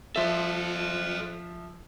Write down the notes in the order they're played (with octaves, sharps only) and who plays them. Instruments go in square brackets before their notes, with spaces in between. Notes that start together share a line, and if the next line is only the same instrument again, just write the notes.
[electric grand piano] F3 E5 [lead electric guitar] A4 C5